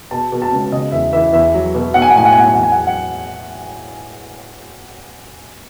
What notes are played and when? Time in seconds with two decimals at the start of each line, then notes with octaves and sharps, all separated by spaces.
0.11 B2 A5
0.32 B2
0.42 A5
0.52 C#2
0.72 C#3 D#5
0.92 E2 E5
1.13 E3 E5
1.33 E2 E5
1.54 F#3
1.75 B2
1.94 B1 F#5
2.02 G#5
2.10 F#5
2.15 A2 G#5
2.25 F#5
2.33 G#5
2.36 B1 F#5
2.48 G#5
2.55 E2 F#5
2.63 G#5
2.72 F#5
2.76 F#3 G#5
2.87 F#5